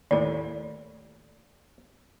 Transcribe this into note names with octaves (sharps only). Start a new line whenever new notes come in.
D#2 A2 D5